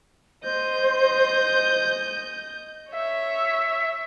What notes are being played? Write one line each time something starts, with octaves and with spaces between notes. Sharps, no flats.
C5 D#5 G6
C#5 E5